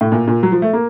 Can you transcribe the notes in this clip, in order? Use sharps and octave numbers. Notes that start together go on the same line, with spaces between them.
A2
A#2
A#2
F#3
F3
A3
A#3